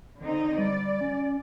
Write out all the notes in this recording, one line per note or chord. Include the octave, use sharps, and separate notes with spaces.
D3 C4 D#4
G3 D5
C#4